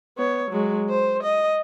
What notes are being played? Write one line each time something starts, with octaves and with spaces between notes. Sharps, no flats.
B3 C#5
F#3 G#3
C5
D#5